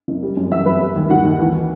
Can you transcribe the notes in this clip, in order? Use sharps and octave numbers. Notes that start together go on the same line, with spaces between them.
F#1
G3
F#2
E3 E5 E6
F#2 B4 B5
G3
D#2
D#3 F#4 F#5
D#2
E3